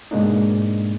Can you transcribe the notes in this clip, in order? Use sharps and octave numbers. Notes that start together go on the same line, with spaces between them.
G#2 B2 G#3 A#3 D4 D#4